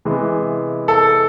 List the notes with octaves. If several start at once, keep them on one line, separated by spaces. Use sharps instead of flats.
C3 E3 G#3 B3
A4